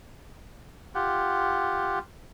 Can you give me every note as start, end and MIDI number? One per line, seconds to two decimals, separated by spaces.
0.95 1.99 65
0.95 1.99 67
0.95 1.99 78